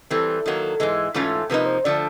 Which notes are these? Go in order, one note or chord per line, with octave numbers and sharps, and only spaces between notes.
E3 G3 C4 A4
D#3 F#3 A#3
G#2 E3 G#3
G#2 E3 A3 C#4 F4
C3 F3 A#3 D#4 B4
C5
D3 F3 A3 D5